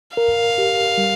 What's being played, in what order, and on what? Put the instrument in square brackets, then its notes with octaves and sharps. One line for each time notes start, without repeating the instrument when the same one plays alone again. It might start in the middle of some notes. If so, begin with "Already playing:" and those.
[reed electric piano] A#4 [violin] F5
[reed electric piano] G4
G3